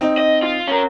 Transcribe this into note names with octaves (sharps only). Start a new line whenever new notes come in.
C4 D#4
D#5
F4
C#4 A#4